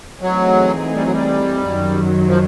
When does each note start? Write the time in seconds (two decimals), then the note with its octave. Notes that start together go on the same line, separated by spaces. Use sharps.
0.21 E3 F#3 A3 C4 D#4 G#4
0.94 G3
1.03 F#3
1.12 G3
1.66 F#2 D#3 F#3
2.27 F3